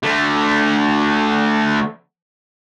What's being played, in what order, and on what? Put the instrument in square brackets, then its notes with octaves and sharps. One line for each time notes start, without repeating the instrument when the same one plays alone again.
[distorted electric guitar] D3 A3